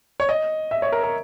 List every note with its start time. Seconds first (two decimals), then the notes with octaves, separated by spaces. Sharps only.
0.20 C#5
0.29 D#5
0.71 E5
0.82 C#5
0.92 A#4
1.03 A#4